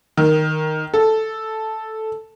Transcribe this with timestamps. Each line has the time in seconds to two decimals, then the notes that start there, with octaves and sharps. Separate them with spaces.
0.17 D#3
0.94 A4